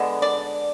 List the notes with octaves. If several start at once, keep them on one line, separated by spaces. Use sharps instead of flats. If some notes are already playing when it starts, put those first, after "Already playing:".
Already playing: D3 G#3 B3 D4
D5